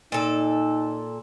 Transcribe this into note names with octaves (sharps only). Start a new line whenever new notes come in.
A#2 D#4 A4